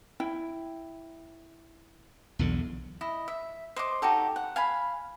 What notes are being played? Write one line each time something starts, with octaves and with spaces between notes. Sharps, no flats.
E4 G5
B1 E2 D3
E4 D#5
E5
C5 D#5 C6 D6
D#4 F#4 G4 A4
F#5
F5 G#5 B5